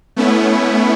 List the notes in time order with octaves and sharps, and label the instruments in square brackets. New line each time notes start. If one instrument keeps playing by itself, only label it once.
[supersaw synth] A3 B3 C#4 E4